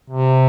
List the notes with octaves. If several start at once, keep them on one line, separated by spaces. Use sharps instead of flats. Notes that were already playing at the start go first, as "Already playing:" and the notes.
C3